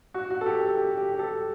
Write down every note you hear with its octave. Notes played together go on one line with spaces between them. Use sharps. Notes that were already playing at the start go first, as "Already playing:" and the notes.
F#4
F#4
A4
G4
A4
G4
G4
G4
A4